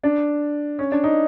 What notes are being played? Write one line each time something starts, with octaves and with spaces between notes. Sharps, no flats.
D4
C#4
D4
D#4